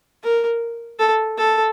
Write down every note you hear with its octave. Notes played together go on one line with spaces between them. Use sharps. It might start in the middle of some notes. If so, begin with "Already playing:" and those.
A#4
A4
A4